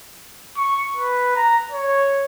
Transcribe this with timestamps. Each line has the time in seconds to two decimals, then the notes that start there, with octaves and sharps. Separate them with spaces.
0.57 C#6
0.96 B4
1.36 A#5
1.71 C#5